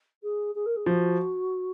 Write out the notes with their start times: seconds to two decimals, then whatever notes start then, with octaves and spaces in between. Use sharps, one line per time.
0.22 G#4
0.55 G#4
0.66 A#4
0.76 G#4
0.86 F3 F#4